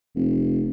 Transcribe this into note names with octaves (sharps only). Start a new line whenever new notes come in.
F1